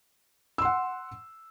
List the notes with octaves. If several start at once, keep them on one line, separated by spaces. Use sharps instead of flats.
F#5 C6 E6